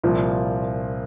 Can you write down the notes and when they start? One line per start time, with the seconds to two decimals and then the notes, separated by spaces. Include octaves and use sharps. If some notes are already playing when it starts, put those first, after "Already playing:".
0.03 C2 A#2 F3 A#3